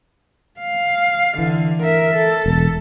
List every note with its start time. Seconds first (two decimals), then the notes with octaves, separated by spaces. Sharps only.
0.60 F5
1.38 D3 E3
1.83 A#4 E5
2.15 A4
2.46 E1